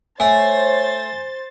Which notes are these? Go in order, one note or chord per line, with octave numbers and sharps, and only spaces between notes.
A3 C5 C#5 G#5 A6